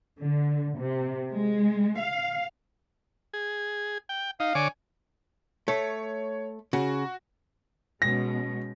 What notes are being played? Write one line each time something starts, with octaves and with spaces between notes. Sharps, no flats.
D3
C3
G#3
F5
G#4
G5
D#4 F5
D3 C#5 G#5 D6
A3 C#5
C#3 F#4
B2 G#3 C#4 A#6